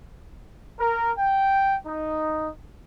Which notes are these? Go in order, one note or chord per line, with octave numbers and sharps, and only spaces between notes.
A#4
G5
D#4